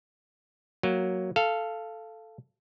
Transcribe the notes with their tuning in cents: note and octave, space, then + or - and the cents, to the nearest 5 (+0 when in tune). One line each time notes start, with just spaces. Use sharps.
F#3 +0 A#3 +0
A4 +0 F5 -10